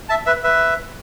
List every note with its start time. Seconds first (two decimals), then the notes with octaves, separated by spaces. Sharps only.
0.09 E5 A5
0.26 B4 E5
0.44 B4 E5